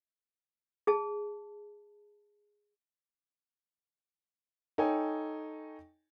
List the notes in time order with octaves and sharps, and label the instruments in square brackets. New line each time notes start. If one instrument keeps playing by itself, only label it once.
[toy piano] G#4 A5
[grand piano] D#4 A4 C#5 G5 G#5